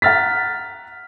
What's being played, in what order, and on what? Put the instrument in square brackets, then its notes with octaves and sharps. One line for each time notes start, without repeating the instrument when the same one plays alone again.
[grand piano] F#5 A#5 F6 A6 B6